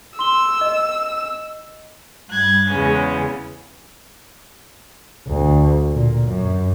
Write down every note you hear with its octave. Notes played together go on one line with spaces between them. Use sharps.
C6 E6 G7
D#5
G2 G3 F#6 G#6 A6
E2 C#3 G#3 B3 C#4
D2
A#2
F#2